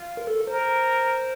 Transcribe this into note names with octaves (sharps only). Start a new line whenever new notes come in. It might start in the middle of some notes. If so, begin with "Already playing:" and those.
Already playing: F4
A#4
A4
A#4 C5